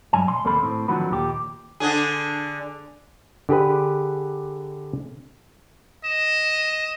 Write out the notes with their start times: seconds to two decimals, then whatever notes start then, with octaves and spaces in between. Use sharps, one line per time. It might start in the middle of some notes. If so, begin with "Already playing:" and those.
0.13 G2 F#3 G#5
0.28 B1 C6
0.44 D#2 A#3 C4 A4 C5 B5
0.63 A2 C4
0.88 D3 D#3 F3 F#3 F#4 B4
1.10 D#2 A#2 G4
1.80 D3 D4 G#4
3.49 D3 G4 G#4 B4
6.04 D#5 E7